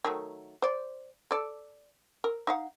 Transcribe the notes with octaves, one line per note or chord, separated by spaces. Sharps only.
D#3 F#3 A3
C5 D5
A4 D5
A#4
D#4 F5 F#5